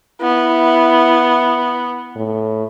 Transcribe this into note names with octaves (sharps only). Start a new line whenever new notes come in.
B3 E4
A2